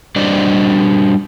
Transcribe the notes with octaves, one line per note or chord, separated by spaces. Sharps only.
G3 D4 F#4 C5 D5 D#5